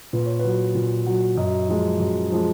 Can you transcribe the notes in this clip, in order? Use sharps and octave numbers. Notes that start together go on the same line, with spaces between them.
A#2 B4
C#5
F#3 B4
A#2
F#3
F#2 D#5
F3 G#3
F#2
F3 G#3